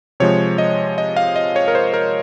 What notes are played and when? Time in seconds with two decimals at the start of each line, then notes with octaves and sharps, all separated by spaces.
0.20 C3 F3 G#3 C#5
0.58 D#5
0.98 D#5
1.17 F5
1.36 D#5
1.56 C#5
1.68 A#4
1.75 C5
1.94 A#4